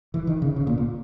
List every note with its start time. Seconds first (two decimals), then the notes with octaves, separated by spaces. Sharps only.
0.14 E3
0.27 D#3
0.42 C#3
0.56 C#3
0.67 A#2
0.78 A#2